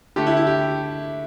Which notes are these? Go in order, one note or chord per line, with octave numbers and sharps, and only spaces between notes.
D3 A3 G4
E4
E4
G4